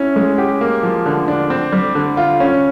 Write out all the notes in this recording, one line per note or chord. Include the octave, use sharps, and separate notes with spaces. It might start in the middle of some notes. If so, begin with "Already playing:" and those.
Already playing: C#4 E4
G#3
G4
A#3
F3
D3
D4
C4
G3
D3
F4
C#4